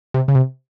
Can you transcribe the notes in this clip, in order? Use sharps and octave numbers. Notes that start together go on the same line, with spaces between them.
C3
C#3
C3